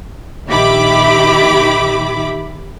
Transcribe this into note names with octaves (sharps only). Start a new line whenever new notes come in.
A#1 D#3 G4 E5 B5 D6